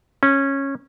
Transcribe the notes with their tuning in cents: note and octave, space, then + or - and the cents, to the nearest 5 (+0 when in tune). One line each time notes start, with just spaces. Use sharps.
C#4 -15